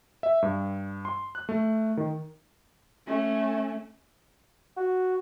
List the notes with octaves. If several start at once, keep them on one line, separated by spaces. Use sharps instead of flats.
E5
G2
C6
F#6
A3
D#3
A3 C#4
F#4